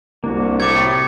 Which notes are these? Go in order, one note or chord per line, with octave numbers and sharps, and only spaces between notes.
C2 A#3 D4 F#4
A2 A3 C#5 E5 A#5 D6 G#6